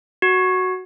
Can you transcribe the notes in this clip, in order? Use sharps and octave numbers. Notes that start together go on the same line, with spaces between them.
F#4